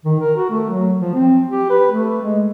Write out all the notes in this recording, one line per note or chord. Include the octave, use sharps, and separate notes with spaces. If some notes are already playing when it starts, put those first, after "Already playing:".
D#3
A#4
F#4
A3
F#3
F3
C4
G4
B4
A3
G#3